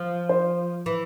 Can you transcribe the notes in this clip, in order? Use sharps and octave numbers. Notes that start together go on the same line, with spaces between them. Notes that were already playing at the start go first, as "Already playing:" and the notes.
Already playing: F3
C5
E3